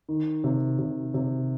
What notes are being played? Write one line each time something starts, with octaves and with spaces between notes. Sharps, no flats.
D#3
C3
C3
C3